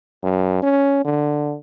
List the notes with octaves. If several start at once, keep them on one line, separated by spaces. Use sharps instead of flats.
F#2
C#4
D3